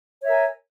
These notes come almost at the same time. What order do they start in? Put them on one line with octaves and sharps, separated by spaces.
C#5 E5 A#4 G#5